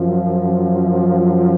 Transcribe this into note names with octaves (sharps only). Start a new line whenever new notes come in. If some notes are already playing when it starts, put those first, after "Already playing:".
Already playing: F#2 F3